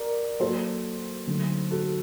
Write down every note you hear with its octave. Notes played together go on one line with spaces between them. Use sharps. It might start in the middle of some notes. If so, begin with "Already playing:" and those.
Already playing: A#4 D5
F#3 A#3 F#4 A4 C5
D3 F#3 A3 D#4
F#4 A4